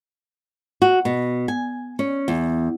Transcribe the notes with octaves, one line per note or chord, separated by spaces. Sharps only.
F#4
B2
G#5
C#4
E2